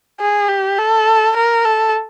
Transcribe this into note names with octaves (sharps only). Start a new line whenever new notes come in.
G#4
G4
A4
A#4
A4